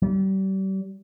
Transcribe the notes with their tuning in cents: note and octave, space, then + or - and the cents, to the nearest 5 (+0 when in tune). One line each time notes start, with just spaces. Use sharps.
G3 -35